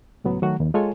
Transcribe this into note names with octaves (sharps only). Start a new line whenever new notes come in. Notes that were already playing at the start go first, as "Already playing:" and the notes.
C#2 A2 F#3 B3
D#3 F#3 A3 F#4
D#2
G#3 F4 A4 C#5 G#5